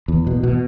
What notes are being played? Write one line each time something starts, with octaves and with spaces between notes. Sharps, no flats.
E2
B2
B2